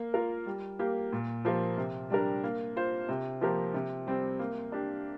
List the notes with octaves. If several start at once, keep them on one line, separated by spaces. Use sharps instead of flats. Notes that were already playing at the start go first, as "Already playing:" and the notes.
Already playing: A#3
F4 A#4
G3
A#3 G4
A#2
F3 A#3 G4 A#4
C3
G3 D4 G4 A#4
A#3
F4 C5
C3
F3 A#3 G4 A#4
C3
G3 C4
A#3
D4 G4